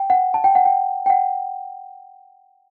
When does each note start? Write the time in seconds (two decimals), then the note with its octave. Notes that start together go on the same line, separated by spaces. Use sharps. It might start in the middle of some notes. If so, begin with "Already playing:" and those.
Already playing: G5
0.10 F#5
0.34 A5
0.44 G5
0.55 F#5
0.66 G5
1.06 G5
1.10 F#5